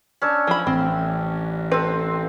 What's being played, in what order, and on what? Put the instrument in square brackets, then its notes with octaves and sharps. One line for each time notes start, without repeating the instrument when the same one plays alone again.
[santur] C#4 D4 E6
[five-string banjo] F3 B5
[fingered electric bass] A1 [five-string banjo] C4
[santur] C4 A4 [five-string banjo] B4